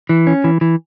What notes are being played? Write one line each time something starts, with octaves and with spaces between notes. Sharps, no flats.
E3
C#4
E3
E3